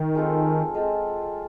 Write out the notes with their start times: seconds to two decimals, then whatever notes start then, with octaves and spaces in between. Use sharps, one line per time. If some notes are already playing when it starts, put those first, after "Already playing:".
Already playing: D#3
0.15 G#3 C4 F4 A4
0.75 G#3 C4 F4 A4